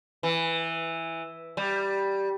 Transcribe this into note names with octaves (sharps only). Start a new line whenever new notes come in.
E3
G3